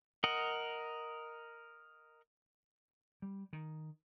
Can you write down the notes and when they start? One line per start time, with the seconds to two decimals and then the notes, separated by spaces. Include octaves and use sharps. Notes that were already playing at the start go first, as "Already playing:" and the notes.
0.24 A#4 D#5 F#5
3.22 G3
3.53 D#3